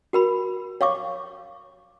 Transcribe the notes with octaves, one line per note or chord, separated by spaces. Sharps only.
F#4 A#4 B5
C#5 F5 C#6 D6